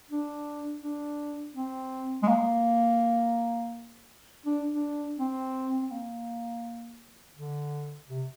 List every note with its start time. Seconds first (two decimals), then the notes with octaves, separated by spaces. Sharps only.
0.11 D4
0.83 D4
1.55 C4
2.23 G#3
2.28 A#3
4.46 D4
4.73 D4
5.19 C4
5.82 C4
5.91 A#3
7.36 D3
8.09 C3